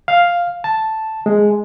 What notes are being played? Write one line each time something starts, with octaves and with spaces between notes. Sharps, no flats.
F5
A5
G#3